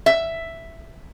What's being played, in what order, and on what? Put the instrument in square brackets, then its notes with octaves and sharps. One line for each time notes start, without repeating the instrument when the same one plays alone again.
[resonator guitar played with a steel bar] E5